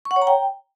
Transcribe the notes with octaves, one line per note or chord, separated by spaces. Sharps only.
C#6
F#5
C#5
A#5
G5